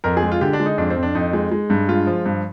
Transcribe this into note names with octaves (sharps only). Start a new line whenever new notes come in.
F2 A#4
G#4
G#3
F4
D3 G4
D4
G#3
D#4
F2 D4
C4
F2
D4
F2 D#4
G#3
G#3
G2
G#3 F4
F3
G2